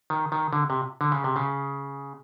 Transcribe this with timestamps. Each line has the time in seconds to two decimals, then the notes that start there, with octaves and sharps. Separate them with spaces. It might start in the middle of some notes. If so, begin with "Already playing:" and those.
0.10 D#3
0.32 D#3
0.53 D3
0.70 C3
1.01 D3
1.12 C#3
1.24 C3
1.36 C#3